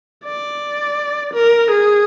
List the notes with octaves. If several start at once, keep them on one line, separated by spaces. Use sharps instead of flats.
D5
A#4
G#4